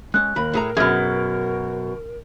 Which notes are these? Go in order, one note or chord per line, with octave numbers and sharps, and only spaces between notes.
G#3 C#4 F#6
D#2 A#4 B5
A2 G#4 A#5
F#2 B2 G#4 F6 G#6